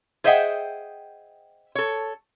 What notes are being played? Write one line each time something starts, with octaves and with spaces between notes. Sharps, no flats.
G#4 C5 D#5 E5 F#5 G5
A4 C#5